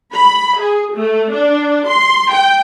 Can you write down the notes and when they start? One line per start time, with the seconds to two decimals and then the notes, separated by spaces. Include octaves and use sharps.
0.14 B5
0.59 G#4
0.94 A3
1.32 D4
1.88 C6
2.31 G5